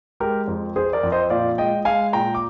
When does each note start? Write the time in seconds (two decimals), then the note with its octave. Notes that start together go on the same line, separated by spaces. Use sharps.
0.20 G#3 G4 A#4
0.48 F2
0.76 F2 G#4 C5
0.93 A#4 D5
1.03 F2
1.12 C5 D#5
1.30 A#2 D5 F5
1.58 G#3 D#5 G5
1.85 G#3 F5 G#5
2.13 A#2 G5 A#5
2.35 D6